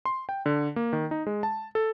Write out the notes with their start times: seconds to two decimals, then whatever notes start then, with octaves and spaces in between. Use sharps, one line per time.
0.05 C6
0.29 G5
0.46 D3
0.76 A#3
0.93 D#3
1.11 D#4
1.27 G#3
1.43 A5
1.75 A4